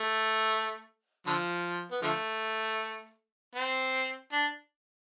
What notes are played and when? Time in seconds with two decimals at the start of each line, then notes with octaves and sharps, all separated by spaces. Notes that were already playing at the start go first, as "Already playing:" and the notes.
Already playing: A3
1.27 D3 F3
1.91 B3
2.02 D3 F3 A3
3.55 C4
4.32 D4